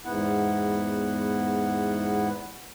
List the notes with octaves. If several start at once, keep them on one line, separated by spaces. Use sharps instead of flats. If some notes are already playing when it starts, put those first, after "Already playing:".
E2 G#2 B3 E4 F#5